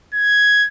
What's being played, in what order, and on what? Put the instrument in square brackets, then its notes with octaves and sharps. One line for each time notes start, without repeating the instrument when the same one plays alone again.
[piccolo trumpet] G#6